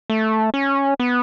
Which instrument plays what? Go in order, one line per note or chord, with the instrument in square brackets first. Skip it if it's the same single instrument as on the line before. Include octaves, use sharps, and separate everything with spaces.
[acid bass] A3
C#4
B3